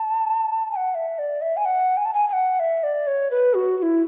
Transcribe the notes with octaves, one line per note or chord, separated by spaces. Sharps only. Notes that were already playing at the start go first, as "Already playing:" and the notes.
Already playing: A5
G#5
F#5
E5
D5
E5
G#5
F#5
G#5
A5
G#5
G#5
F#5
E5
D5
C#5
B4
F#4
F#4
E4